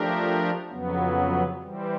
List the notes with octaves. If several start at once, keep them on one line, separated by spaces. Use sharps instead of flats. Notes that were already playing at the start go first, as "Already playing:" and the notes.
Already playing: F3 A3 D4 G4 A#4
F2 C#3 F#3 B3
E3 G3 C4